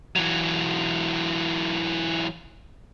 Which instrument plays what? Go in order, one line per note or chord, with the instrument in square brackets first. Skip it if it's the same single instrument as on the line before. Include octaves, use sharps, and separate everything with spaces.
[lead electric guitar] E3 F#3